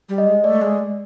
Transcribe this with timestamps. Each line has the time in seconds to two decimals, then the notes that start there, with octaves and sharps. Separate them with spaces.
0.09 G3
0.18 D#5
0.27 G#3
0.44 A3 D5
0.62 G#3